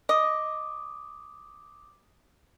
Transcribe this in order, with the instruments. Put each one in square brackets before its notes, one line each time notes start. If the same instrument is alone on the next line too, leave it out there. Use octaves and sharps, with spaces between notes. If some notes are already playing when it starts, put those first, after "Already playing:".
[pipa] D#5 [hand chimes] D6 D#6